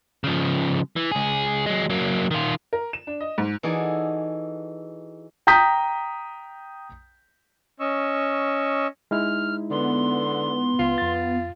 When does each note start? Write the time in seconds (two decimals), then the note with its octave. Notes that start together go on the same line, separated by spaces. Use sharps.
0.24 C#3 F3
0.96 E3
1.11 C#2 G#4
1.66 F#3 G#3
1.90 F#3 A#3
2.31 D#3 F4
2.73 A#4
2.93 E7
3.07 D4
3.21 D#5
3.38 G#2
3.63 E3 D#4 F#4 G#4 A4 D5
5.47 G5 A#5 D#6 G6 B6
7.80 C#4 D#5 C#6 E6
9.11 G#3 D#4 E4 F6
9.71 D3 B3 C6
10.79 C#2 F4
10.98 F2 A6